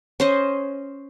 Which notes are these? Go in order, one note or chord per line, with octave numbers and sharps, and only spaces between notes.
C#4 C5 D#5